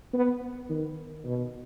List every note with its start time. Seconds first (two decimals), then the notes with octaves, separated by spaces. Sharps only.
0.13 B3
0.70 D#3
1.25 B2